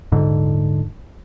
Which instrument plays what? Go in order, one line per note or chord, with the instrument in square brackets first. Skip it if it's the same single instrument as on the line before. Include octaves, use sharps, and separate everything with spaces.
[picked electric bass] D#1 G#2 D3